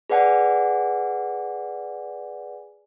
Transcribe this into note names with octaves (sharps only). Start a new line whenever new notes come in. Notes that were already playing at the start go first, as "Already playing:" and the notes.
G#4 B4 D5 F#5 G#5